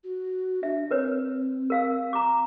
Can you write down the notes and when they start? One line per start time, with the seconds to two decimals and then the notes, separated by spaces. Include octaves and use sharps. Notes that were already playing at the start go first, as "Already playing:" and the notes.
0.04 F#4
0.63 D4 E5
0.91 C4 A#4 B4 C#5
1.70 A#4 F5 E6
2.13 A#5 D6